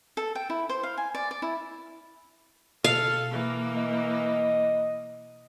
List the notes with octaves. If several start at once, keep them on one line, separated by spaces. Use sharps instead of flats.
A4
G5
E4
C5
F5
G#5
D5
D5
E4
B2 A4 F5
E3 A#3
D#5